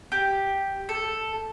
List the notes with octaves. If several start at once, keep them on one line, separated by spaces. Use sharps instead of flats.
G4
A4